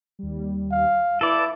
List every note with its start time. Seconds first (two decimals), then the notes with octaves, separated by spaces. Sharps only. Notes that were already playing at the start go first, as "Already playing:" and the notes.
0.19 D#2 G3
0.72 F5
1.21 E4 A4 B4 D5 D7